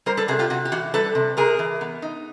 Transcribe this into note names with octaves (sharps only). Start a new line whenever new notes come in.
G3 A#4 C5
A4 B4
C3 F#4 G#4
F4 G4
C3 F#4
G4
E3 F#4
G3 A4 B4
C3
C3 G#4 A#4
E3
B3
D#4